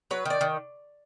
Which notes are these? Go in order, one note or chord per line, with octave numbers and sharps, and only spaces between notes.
F#3 B4
D#3 D5
D#3